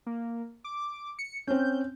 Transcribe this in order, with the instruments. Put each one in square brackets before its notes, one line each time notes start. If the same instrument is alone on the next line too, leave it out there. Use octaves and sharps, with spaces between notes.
[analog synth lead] A#3
D6
C#7
[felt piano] C4 C#4 [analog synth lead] G6